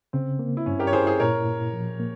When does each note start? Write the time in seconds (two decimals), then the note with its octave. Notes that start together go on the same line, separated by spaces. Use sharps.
0.13 C#3 C4
0.39 A#3
0.57 E4
0.66 G2 C#4
0.79 G4 A#4
0.87 C#5
0.93 E4 G#4 C5
1.07 G#4 C5
1.20 A#2 A#4 C#5
1.46 A#2
1.73 F3
2.00 A#3